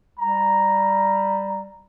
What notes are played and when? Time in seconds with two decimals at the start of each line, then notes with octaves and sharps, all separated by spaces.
0.19 G3 A#5